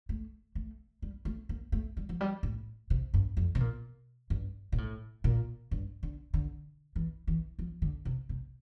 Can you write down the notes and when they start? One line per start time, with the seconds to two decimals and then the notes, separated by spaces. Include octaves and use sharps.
0.09 A3
0.55 A3
1.02 G3
1.25 A3
1.49 A#3
1.72 A3
1.97 G3
2.09 F3
2.21 G3
2.43 A2
2.90 C3
3.14 G2
3.37 F2
3.55 C3
3.60 A#2
4.30 G2
4.72 A#2
4.78 A2
5.24 A#2
5.71 G2
6.03 D3
6.34 D3
6.96 E3
7.27 E3
7.59 F3
7.82 D3
8.05 C3
8.29 C3